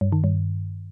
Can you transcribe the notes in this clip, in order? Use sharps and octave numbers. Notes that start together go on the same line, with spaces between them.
G2
D#3
G2